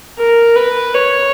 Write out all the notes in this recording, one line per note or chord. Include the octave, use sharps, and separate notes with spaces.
A#4
B4
C#5